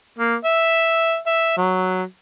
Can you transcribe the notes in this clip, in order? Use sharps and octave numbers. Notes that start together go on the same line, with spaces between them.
A#3
E5
E5
F#3